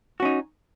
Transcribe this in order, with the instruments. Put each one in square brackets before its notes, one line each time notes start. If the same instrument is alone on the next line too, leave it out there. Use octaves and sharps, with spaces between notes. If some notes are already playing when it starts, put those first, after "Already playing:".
[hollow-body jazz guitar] F#4
C#4
D#4